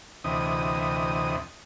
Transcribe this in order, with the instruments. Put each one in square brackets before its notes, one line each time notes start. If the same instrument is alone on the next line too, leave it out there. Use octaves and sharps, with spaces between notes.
[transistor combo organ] D2 C3 E3 D#5 D#6